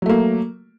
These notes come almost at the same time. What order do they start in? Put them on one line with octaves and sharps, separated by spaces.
F#3 A3 A#3